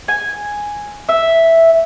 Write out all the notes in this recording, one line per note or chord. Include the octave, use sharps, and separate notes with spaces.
G#5
E5